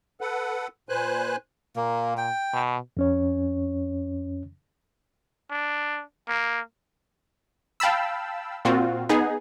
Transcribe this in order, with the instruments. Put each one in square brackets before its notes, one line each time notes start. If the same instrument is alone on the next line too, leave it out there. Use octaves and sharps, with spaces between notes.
[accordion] A4 B4 F#5
A#2 B4 C5 G#5 F#6
[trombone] A#2 [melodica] A#3
[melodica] G5
[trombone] B2
[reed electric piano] F2 C#4 C#5
[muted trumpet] D4
A#3
[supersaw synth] F5 G5 A5 B5 E6
A#2 C4 F4 F#4
B3 D#4 G#4